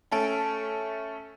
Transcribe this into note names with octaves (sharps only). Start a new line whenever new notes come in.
A3 C#4 A4 D7